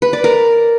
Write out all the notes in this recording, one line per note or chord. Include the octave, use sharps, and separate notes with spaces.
B4
D5
A#4